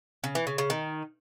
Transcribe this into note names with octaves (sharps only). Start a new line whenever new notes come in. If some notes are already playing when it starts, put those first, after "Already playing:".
C#3
E3
C#3
C#3
D#3